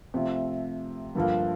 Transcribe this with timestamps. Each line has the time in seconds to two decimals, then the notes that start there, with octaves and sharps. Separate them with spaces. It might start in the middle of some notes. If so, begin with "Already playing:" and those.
0.14 C3 F3 A3
1.15 G2 D3 F3 A#3